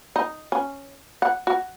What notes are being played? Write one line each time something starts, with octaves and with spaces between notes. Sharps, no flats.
D#4
C#4
F#5
F#4